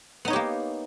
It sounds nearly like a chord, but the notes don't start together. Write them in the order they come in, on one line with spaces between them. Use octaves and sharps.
B3 D#4 C#5 G4 A#3